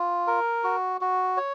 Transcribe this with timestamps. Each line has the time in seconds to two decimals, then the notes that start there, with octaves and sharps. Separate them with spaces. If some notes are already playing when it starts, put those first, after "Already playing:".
Already playing: F4
0.27 A#4
0.64 F#4
1.01 F#4
1.37 C#5